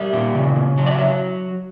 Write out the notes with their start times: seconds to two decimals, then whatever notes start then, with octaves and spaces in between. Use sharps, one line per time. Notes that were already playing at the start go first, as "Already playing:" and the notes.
Already playing: G3 E5
0.13 A#2
0.35 C#3
0.56 C#3
0.78 F#3
0.86 D5
0.91 E5
0.99 F#3